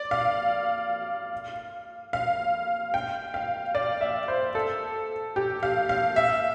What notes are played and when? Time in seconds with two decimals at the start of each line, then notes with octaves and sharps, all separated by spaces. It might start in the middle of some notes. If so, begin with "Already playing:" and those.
Already playing: D5
0.11 F5
2.13 F5
2.94 G5
3.34 F5
3.75 D5
4.01 E5
4.28 C5
4.55 A4
5.36 G4
5.63 F5
5.89 F5
6.16 E5